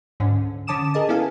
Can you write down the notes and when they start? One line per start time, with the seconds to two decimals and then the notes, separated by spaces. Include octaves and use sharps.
0.20 D2 G#2 D3 C#4
0.67 D3 C#4 A5 D6 D#6 E7
0.94 G#4 A#4 D#5 A5
1.09 B3 C#4 E4 A4 F5 G#5